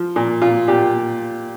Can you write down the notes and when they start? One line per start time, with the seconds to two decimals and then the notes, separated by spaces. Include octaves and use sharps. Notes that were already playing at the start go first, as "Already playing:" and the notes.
Already playing: F3
0.16 A#2
0.42 A#2 F4
0.68 A#2 G4